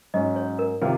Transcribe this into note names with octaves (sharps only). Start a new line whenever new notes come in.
G#2 F#3 C#4 D#5
C#5
A#4
C3 D#3 A#3 F4 G#4